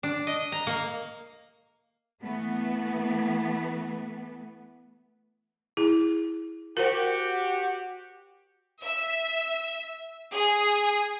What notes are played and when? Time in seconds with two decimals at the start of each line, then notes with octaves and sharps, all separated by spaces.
0.03 D4
0.27 D#5
0.52 A#5
0.67 A#3
2.21 E3 A3 B3
5.77 E4 G#4
6.77 F#4 G4 A#4 C5
8.84 E5
10.32 G#4